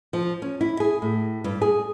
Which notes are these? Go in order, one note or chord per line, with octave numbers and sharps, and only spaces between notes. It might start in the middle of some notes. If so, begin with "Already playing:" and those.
F3
C#4
E4
G#4
A2
G2
G#4